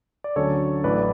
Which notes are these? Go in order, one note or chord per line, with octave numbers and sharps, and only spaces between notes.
D5
D2 D3 F#3 C#4 A4 C#5
A1 A2 F#3 A3 B4 D5